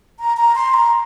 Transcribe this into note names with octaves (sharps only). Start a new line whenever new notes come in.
A#5
A#5
C6
A#5